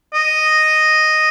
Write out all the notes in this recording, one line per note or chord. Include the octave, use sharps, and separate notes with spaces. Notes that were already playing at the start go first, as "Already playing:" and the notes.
D#5